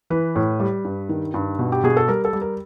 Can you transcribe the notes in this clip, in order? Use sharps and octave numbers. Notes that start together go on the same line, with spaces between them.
E3 B4
A2
G3
G2
D#3
G2
B2
G4
B2 G#4
A4
G3 A#4
A4
G3
A#4